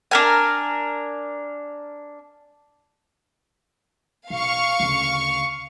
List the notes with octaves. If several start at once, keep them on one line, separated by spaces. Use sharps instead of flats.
D4 A#4 G#5
B1 F5 C#6
D2 C#3